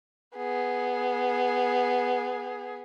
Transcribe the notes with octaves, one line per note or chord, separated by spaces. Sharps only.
B3 G#4